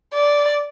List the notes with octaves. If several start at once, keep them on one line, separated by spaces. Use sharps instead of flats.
D5